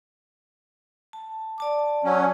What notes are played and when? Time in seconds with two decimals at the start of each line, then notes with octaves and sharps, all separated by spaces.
1.13 A5
1.58 D5 A5 D6
2.04 F#3 C#4